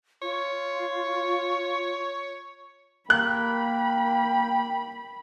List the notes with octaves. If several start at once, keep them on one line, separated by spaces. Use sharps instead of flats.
F4 C#5
A#3 G5 B5 F#6